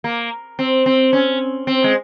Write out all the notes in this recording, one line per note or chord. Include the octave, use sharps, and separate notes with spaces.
A#3
C4
C4
C#4
C4
G#3